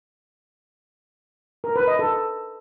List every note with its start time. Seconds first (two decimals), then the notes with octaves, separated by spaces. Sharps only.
1.64 A#4
1.76 B4
1.87 D#5
1.99 A4